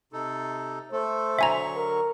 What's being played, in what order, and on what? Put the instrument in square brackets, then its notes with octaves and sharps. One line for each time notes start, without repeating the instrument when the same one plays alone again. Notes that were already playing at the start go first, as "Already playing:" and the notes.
[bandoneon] C3 D#4 A4
[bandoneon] A3 A4 [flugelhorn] C5
[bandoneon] D3 F#3 C#6 [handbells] E5 G#5 A#5
[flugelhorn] A#4